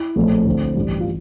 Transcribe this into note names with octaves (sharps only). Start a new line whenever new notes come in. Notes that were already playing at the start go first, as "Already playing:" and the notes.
Already playing: E4
A#1 A2 F3 A3 C4
D2 D3 A3 C4
A1 G2 E3 G3
F4